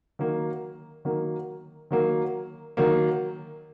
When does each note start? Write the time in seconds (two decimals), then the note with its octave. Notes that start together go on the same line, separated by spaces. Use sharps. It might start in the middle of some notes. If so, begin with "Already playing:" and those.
0.19 D#3 F#3 A#3
1.05 D#3 F#3 A#3
1.91 D#3 F#3 A#3
2.77 D#3 F#3 A#3